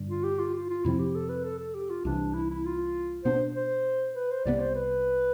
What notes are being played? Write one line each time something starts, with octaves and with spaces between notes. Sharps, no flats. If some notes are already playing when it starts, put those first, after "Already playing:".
Already playing: G2 D3 G3
F4
G4
F4
F4
F4
F2 C3 F3 C4 E4
G4
A4
B4
A4
A4
G4
F4
C2 C3 E3 D4
E4
E4
F4
B2 B3 D4 C5
C5
B4
C5
C2 C3 F3 B3 D5
C5
B4